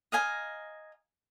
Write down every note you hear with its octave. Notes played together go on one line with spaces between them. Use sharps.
D#5 F5 G#5 A#5